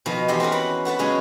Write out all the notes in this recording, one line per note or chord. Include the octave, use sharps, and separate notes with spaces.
B2 D#3 F3
E2 G4 D#5 E5 C6
C4 C#4 F#4 A#4
B4 F#5 B5
B3 F#4 B4 A5
C#3 F#3 G#3 C#4 G#4